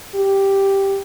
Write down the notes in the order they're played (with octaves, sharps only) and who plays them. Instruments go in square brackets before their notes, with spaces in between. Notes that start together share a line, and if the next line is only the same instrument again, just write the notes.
[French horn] G4